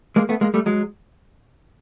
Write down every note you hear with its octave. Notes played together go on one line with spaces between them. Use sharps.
G#3 A#3
A3 B3
G#3 A#3
G3 A3
F#3 G#3